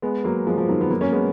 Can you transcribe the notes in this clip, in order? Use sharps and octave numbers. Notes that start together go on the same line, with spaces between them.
G#3 B3
F#3 A#3
F3 G#3
F3
D#3 F#3
B3
F#3 A#3
A#3 C#4
G#3 B3